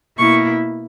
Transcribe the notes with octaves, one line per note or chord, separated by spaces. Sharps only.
B2 A#3 E4 C#6